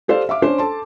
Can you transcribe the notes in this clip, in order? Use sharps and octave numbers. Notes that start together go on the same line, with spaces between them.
G4 A4 C5 D5 F5
E5 F5 D6
C#4 D4 C5
A4 A5 C6